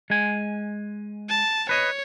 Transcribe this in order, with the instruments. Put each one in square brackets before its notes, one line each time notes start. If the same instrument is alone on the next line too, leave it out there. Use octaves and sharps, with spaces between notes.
[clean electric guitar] G#3 G#5
[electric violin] A5
[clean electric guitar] B4 D#5 [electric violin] C#5